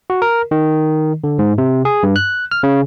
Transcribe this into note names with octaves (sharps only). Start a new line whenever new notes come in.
F#4
A#4
D#3
D3
G#2
C3
G#4
G2
F#6
F6
C#3